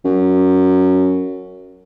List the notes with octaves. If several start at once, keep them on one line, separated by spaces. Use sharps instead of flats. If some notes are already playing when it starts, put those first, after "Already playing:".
F#2